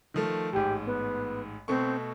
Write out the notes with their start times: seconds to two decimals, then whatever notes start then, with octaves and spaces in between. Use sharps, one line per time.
0.14 D#3 F3 A3
0.53 A1 G#2 G4
0.86 B3
1.68 B2 A3 C4 C#6